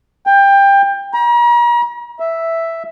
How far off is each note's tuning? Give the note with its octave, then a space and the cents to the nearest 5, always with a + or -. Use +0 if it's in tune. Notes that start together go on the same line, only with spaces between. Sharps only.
G5 +20
A#5 +40
E5 +0